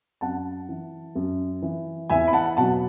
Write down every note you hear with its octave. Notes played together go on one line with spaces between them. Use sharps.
F#2 F#5 A5
E3
F#2
E3
E2 E5 G#5
B5
F#5 A5
B2 F#3 F#5 A5